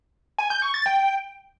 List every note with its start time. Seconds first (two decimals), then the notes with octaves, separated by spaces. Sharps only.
0.38 G#5
0.50 G6
0.62 C#6
0.74 A6
0.86 G5